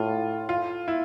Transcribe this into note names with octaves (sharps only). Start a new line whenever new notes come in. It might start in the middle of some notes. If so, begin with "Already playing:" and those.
Already playing: A2 F4 A4
F4
E4